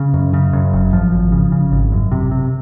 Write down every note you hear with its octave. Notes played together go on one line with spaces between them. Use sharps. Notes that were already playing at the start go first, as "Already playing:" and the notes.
Already playing: C#3
F#2
C#3
F#2
F#1
G#1 F3
G#1
C#3
C#3
G#1
F#2
C3
C3